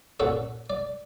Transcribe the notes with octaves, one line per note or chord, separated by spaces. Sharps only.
A#2 C#4 F#4 A4
D5